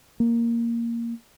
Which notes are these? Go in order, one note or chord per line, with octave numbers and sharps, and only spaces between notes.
A#3